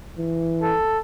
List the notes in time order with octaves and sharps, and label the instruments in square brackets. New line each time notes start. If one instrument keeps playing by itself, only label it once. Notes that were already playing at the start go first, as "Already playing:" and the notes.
[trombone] E3
[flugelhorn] A4